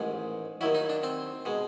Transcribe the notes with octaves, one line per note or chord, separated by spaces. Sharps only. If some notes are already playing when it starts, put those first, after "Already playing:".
Already playing: A1 G#2 D#3 G#3
D#2 D#3 F#3 E4
D#4
D4
C4
B2 G#3